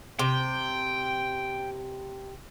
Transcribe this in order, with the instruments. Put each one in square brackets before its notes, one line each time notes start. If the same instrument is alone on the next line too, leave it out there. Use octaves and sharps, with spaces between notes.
[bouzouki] C3 [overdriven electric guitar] G5